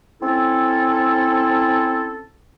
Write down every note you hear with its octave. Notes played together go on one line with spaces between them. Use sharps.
C4 C#4 E4 A4